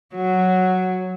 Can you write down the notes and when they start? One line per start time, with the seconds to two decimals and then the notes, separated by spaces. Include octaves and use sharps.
0.15 F#3